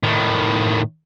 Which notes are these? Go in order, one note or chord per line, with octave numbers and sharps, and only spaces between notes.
A2 D#3